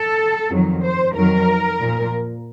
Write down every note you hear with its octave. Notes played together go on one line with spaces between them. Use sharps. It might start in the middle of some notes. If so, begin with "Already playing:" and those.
Already playing: A4
F2 D#3 F#3
C5
F2 D#3 F#3 A#4
A#2 F3